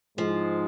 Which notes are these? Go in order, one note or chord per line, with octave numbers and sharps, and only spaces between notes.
G#2 F3 G#3